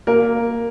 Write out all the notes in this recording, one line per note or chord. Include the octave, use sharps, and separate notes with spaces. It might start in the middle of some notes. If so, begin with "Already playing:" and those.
A#3 A#4